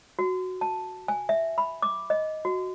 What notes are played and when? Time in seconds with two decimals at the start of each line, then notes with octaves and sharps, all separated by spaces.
0.19 F#4
0.61 A5
1.08 G#5
1.29 E5
1.58 B5
1.82 D6
2.10 D#5
2.45 F#4